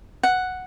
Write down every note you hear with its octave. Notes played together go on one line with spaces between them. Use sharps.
F#5